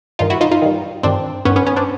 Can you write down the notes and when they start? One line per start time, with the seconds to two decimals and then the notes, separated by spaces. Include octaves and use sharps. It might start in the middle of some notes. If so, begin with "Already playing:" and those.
0.19 G2 D#3 D#4 F4
0.30 E4 F#4
0.41 D#4 F4
0.51 D#4 F4
0.62 G2 D#3
1.03 G2 D#3 C4 D4
1.45 G2 D#3 B3 C#4
1.56 B3 C#4
1.67 B3 C#4
1.76 C4 D4